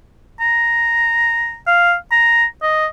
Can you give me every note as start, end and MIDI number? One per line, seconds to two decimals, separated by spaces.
0.40 1.56 82
1.67 1.94 77
2.12 2.45 82
2.62 2.86 75